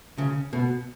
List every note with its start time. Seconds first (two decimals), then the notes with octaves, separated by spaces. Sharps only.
0.18 C#3
0.53 B2